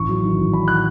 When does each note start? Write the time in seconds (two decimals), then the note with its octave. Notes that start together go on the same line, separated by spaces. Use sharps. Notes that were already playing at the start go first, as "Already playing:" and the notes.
Already playing: A1 C#6
0.09 F#3
0.24 D#3
0.39 A1
0.53 D#3 B5
0.68 F#6